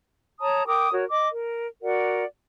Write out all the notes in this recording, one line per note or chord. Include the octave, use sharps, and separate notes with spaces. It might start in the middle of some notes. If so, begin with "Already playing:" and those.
C#5 A5 A#5 D#6
A#4 G5 D6 D#6
F#4 A#4 C#5
D#5 D6
A#4
F#4 A#4 D5 F#5